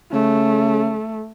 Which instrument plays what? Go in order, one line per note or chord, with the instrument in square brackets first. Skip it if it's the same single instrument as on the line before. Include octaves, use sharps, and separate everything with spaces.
[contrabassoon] C#3 [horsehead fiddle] A3